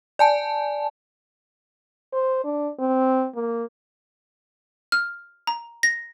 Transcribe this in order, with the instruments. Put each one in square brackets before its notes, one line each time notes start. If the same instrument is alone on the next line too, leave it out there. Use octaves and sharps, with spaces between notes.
[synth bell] D5 G#5 A5
[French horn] C5
D4
C4
A#3
[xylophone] F6
A#5
A#6